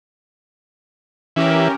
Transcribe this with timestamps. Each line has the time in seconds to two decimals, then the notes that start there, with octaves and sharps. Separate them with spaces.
1.36 E3 C#4 G4 A#4